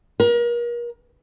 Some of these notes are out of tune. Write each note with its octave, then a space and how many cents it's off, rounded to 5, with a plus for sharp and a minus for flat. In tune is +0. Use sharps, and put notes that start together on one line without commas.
A#4 +35